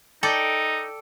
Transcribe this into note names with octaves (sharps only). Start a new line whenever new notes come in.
D#4 A4 D5 G5